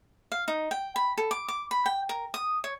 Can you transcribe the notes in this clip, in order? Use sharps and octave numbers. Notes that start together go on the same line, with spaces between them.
F5
D#4
G5
B5
A4
D6
D6
B5
G5
A#4
D#6
C#5